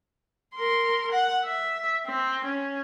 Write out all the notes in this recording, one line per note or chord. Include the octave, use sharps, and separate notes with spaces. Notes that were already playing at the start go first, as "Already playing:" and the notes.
A#4 C6
F#5
E5
C4
C#4